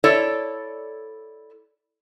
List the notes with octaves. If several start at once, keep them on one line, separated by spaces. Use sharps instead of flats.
E4 A4 C#5 D5